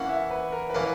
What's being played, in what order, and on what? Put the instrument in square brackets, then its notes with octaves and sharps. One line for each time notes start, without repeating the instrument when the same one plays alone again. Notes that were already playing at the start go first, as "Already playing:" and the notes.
Already playing: [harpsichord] E3 A#3 C#4 [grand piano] F#5
[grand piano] E5
B4
A#4
B4
[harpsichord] E3 A#3 C#4 [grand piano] A#4